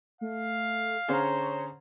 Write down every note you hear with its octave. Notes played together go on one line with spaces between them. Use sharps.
A3 F5
D3 C#4 G#4 C5 C#5 A#5